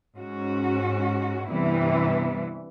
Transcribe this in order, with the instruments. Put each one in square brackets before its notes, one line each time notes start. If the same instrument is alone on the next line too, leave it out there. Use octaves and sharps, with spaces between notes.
[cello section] G#2 C#4 F#4
G2 C3 E3 G3 B3 E4